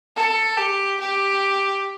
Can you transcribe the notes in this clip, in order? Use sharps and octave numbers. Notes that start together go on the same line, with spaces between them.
A4
G4
G4